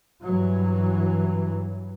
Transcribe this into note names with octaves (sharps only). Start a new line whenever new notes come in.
G2 E3 F#3